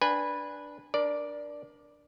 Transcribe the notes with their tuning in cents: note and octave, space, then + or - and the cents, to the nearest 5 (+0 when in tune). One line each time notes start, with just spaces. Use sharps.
D4 +0 B4 -10 G#5 -20
D4 +0 A#4 +30 D5 +0